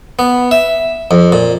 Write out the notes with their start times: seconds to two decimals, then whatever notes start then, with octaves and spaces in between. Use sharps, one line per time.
0.19 B3
0.51 E5
1.11 F2
1.32 A#2